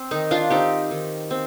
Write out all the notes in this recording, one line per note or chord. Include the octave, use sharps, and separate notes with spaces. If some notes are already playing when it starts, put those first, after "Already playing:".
Already playing: C4
D#3 D#4
D4 F4
C4 D#4 G4
D#3
C4